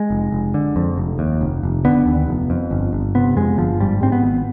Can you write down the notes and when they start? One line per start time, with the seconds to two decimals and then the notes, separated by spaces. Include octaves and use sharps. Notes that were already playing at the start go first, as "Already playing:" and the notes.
Already playing: G#3
0.10 F1
0.32 F1
0.54 D3
0.76 F2
0.98 F1
1.19 D#2
1.41 F1
1.63 F1
1.85 D3 B3
2.06 D#2
2.28 F1
2.50 F2
2.71 G1
2.93 G1
3.15 C3 B3
3.37 F2 G#3
3.58 G1 F3
3.80 G#2 G3
4.02 G#2 C4
4.12 B3
4.23 G#1